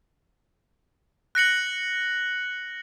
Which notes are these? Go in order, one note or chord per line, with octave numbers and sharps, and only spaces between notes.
F#6 A#6 C#7 F#7